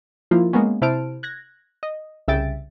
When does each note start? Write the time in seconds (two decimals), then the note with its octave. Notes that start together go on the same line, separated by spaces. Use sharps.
0.31 F3 A#3 E4 F4
0.53 G#3 A#3 B3 C#4
0.81 C3 E4 C5 A5 F6 D7
1.23 F#6 G#6 A#6
1.83 D#5
2.28 C2 C#3 E5 G5 A6 D7